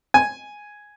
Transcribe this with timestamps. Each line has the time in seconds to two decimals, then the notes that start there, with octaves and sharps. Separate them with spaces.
0.14 G#5